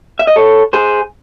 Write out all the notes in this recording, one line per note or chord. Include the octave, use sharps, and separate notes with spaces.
E5
D#5
A4 C#5
G#4 C5